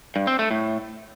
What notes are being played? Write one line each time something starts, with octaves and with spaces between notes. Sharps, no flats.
G2
C4
A3
A2